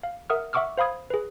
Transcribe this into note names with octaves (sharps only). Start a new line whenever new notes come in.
F5
A#4 E5 F#5 D#6 F6
E5 F#5 C#6 D6 E6 F6
C5 F5 B5 D#6 G#6
G#4 B4